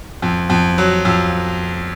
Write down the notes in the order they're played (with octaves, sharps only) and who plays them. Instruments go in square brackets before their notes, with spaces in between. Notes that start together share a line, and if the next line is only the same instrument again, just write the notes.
[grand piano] F2
F2
F#3
F2